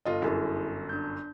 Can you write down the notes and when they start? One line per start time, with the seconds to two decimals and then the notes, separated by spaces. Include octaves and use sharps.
0.05 G1 F4 D#5
0.22 G1 F#2 E4 G#4
0.89 D4 G6